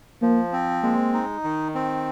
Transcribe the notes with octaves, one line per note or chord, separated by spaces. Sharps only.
F3 A#3
C4
G#3 A#3
D#4
D#3
C4